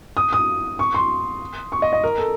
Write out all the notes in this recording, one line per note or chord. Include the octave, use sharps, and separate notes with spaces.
D#6
D#6
C#6
C6
C#6
D#5
D#5
A#4
A4